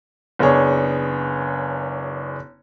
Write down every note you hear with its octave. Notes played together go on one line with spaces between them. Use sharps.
F#1 B3 D4 G#4 C#5